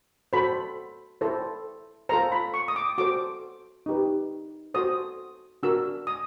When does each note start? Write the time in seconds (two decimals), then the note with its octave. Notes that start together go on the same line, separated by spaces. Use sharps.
0.33 F#4 A4 C5 B5
1.21 E4 A4 C5
2.09 F4 A4 C5 A#5
2.32 B5
2.54 C#6
2.68 D#6
2.76 D6
2.98 F#4 A4 C5 D6
3.86 D#4 G4 B4
4.74 F#4 A4 C5 D#6
5.63 D4 F#4 A#4 E6
6.07 D#6